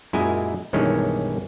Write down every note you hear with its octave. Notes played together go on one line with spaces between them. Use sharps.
F#2 A#2 G#3 E4 D#5 G#5
B1 G2 D#3 E3 G#3 C#4